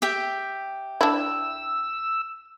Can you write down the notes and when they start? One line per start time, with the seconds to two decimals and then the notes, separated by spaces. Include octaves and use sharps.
0.02 G4 E5 G5
1.01 D4 E4 E6